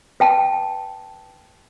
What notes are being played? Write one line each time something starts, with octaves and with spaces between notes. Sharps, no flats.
B4 G5 A5